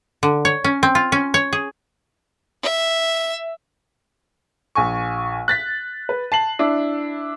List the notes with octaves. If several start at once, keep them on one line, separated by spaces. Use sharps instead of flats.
D3
C#5
C#4
C4
F4
C#4
C#5
G#4
E5
A#1 G#5 C#6
F#6 A6 B6
B4
A5 C7 F#7
D4 E4